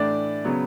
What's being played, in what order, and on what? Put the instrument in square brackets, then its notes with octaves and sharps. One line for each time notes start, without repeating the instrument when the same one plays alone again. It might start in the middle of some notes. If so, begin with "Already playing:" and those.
Already playing: [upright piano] A2 E3 A3 D4 D5
C#3 F#3 B3